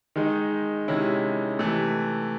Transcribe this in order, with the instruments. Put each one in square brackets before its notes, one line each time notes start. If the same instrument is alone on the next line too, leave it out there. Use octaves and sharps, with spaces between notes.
[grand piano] D#3 G#3 D#4
C3 D#3 G#3 C#4 E4
C3 E3 A3